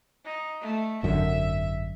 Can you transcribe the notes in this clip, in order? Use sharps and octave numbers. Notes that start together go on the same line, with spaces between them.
D#4
A3
G#1 F#2 D3 E5